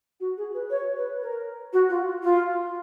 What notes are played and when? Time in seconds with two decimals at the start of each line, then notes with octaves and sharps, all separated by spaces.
0.20 F#4
0.37 G#4
0.54 B4
0.70 C#5
0.96 B4
1.22 A#4
1.73 F#4
1.89 F4
2.23 F4